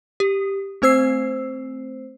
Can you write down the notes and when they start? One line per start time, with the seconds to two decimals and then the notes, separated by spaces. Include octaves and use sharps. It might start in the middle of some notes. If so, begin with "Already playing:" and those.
0.20 G4
0.82 A3 C4 C5 E6 C7